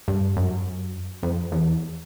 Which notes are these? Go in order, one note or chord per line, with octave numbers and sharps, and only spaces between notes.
G2
F#2
F2
E2